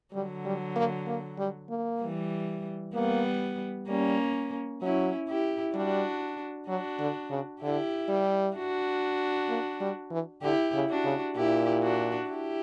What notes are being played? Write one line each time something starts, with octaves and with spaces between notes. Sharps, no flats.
D3 F#3 G3
G3
A#3
A#3
G3
A#3
E3 G3
G3 A#3 B3
G3 A#3 C#4
F#3 C#4 E4
E4 G4
G3 D4 F#4
F#3 D4 F#4
D3
C#3
D3 E4 G4
G3
D4 F#4
A#3
G3
E3
D3 E4 G4
C#3
D4 F#4
C#3
A#2 E4 G4
D4 F#4
E4 G4